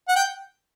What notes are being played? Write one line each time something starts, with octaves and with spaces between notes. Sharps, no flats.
F#5
G5